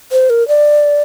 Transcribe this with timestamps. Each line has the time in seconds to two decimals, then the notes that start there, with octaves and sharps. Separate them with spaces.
0.12 C5
0.30 A#4
0.48 D5